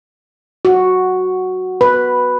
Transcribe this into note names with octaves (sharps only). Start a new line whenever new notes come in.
F#4
B4